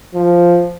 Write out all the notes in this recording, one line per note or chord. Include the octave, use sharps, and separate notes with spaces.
F3